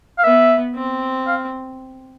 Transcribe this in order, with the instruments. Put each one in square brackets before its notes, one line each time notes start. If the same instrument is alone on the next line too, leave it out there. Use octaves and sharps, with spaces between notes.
[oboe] F5
[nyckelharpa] B3 [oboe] E5
[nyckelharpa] C4
[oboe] F5